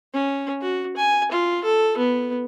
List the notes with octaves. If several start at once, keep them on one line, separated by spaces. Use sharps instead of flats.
C#4
F#4
G#5
F4
A4
B3